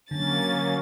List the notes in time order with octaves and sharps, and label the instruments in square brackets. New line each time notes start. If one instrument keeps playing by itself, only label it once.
[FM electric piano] D3 [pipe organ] F#3 A#3 C#4 [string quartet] A6